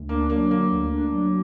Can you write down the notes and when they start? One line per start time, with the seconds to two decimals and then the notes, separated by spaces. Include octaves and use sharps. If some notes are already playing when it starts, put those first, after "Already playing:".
Already playing: D2
0.09 A#3 D4
0.30 F#3 A#3
0.51 D3 A#3
0.71 D2
0.92 D4
1.12 F#3